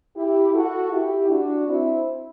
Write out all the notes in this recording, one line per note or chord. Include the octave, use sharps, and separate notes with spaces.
E4 G4
F#4 A4
E4 G4
D4 F#4
C4 E4